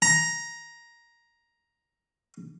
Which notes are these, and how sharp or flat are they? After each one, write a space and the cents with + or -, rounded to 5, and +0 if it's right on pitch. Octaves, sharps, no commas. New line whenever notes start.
A#5 +10